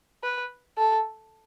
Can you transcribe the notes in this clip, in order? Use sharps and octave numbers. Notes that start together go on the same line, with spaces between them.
B4
A4